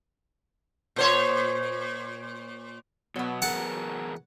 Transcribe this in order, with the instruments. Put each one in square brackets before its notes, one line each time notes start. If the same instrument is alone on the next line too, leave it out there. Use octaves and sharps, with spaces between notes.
[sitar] A#2 C5 C#5
[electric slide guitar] B2 [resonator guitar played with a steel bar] F#3 B3
[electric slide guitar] E2 G#4 A#4 [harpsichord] F#5 A5